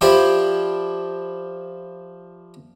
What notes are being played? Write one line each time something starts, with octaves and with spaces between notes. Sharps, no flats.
F3 E4 G4 C5 D5